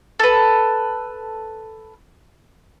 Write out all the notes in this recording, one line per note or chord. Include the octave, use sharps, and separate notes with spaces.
A4 B4